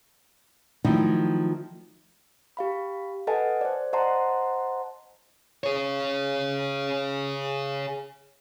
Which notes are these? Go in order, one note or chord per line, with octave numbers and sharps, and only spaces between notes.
D#3 F3 F#3 A3 D#4 E4
G4 F5 B5
A4 B4 D#5 F#5 G#5 A5
C5 D5
C5 D#5 F#5 A5 A#5 C6
G#4 C#5